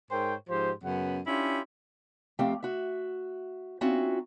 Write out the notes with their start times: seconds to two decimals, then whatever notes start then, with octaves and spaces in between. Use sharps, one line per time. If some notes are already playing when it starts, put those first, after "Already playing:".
0.11 G#2 A#4 C5 C#5 G5
0.49 G#2 F3 G4 C5
0.84 F#2 C#3 B3 F#5
1.26 C#4 D4 E4 F4 G4
2.39 F2 A3 C4 G4 F5 G5
2.63 F#4 E5
3.81 C4 C#4 D#4 F4 F#4 E5